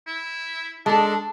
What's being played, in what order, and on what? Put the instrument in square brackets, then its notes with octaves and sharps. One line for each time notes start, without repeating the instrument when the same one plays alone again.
[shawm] E4
[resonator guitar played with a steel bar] G#3 A4 [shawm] D4 [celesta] A5